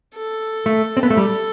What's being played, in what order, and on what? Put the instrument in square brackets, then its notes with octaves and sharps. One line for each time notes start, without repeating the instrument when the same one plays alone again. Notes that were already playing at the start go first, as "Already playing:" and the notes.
[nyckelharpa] A4
[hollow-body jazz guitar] A3
C4
B3
A3
[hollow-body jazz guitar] G3 [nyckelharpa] A4